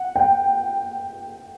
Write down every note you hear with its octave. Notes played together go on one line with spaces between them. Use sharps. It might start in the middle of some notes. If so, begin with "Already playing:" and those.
Already playing: F#5
G5